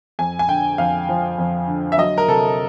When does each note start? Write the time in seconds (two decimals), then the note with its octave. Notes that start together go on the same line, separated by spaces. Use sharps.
0.19 F2 G#5
0.39 G#5
0.48 D3 G5
0.78 F2 F5
1.09 F3
1.38 F2
1.68 D3
1.92 E5
1.98 F#3 D#5
2.18 A#4
2.28 C3 A4